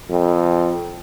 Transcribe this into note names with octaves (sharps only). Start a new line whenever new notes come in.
F2